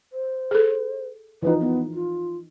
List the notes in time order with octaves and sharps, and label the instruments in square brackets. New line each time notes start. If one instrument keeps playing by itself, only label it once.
[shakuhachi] C5
[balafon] G#4 A4
[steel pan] E3 F3 D#4 [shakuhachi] B4
[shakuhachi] B3
F4